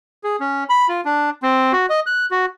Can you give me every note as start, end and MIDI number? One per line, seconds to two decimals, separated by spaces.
0.24 0.36 68
0.40 0.64 61
0.70 0.87 83
0.89 1.01 65
1.05 1.30 62
1.43 1.72 60
1.73 1.86 66
1.90 2.00 75
2.06 2.26 90
2.31 2.46 66